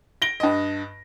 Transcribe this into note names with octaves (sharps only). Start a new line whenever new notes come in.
A#6 D7 G7
G2 D#5